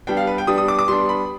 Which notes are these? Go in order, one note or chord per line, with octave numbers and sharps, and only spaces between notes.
G3 B3 D4 G5
F5
B4
G5
G3 B3 D4 D#6
D#6
D6
D6
G3 B3 D4 C6
B5